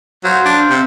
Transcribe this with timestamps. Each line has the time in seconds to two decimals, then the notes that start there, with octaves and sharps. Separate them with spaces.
0.24 F#3 C5 F5
0.46 D4
0.70 C3